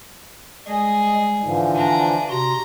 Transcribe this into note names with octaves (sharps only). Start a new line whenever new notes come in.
G3 G#3 G#4 D#5
G#2 D3 E3 F3
D4 G#5 A#5
C3 F#4 A#5 C6